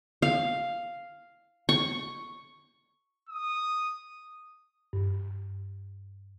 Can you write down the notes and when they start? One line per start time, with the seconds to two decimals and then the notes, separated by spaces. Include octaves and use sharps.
0.22 F5
1.69 C#6
3.29 D#6
4.93 G2